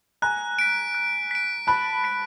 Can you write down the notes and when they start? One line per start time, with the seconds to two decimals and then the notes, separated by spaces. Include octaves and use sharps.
0.22 G#5 A#5 F#6
0.59 B6 D7
0.95 F#6
1.31 B6 D7
1.67 A5 B5 F#6
2.04 B6 D7